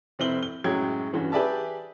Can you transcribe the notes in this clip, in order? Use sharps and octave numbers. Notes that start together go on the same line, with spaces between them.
F1 C4 E4 F#7 G7
G7
F#2 A2 F#3 G#3 G5 G#6
G2 E3 C#4 F#4
G4 G#4 B4 D5 E5 A5